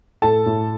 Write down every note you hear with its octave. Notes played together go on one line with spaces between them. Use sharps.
A2 A4 A5
A2